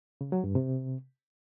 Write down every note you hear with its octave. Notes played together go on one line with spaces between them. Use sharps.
C#3
F#3
G2
C3